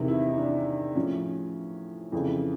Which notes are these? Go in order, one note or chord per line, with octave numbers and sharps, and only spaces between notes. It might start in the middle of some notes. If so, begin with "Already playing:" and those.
Already playing: E2 C3 D#3
E4
D#4
D4
A2 F3 C#4
F2 C#3 E3